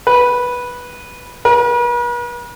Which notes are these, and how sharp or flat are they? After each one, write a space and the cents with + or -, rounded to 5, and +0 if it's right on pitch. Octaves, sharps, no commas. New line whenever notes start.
B4 -10
B4 -45